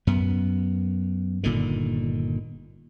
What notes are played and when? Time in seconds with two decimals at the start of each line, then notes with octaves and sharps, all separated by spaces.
0.07 F#2 B3
1.43 G1 A#2 D3 D#3